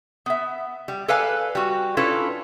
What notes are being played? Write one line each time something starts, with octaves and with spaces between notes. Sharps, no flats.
B3 E5
G3
A4 B4 D5 F5 G#5
G3 F#4
C#4 D4 E4 F4 A4 B4